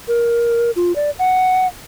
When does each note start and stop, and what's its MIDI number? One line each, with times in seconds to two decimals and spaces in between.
0.08 0.71 70
0.76 0.95 65
0.96 1.11 74
1.19 1.67 78